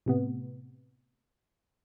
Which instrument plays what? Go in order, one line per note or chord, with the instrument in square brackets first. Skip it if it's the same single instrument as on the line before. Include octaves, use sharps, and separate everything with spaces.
[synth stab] A2 C3 B3